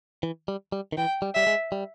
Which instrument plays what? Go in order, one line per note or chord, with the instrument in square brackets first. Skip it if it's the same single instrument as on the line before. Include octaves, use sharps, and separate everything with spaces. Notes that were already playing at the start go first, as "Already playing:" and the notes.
[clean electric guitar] E3
G3
G3
D#3
[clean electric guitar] E3 [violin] G5
[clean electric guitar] G3
[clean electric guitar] G3 [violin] E5
[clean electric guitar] G#3
G3